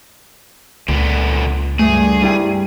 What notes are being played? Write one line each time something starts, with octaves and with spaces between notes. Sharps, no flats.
C#2 A#2 D3 B3
G2 A3 G#4
G3 E4 G5